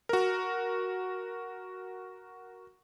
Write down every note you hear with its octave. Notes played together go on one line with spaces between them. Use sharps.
F#4 A#4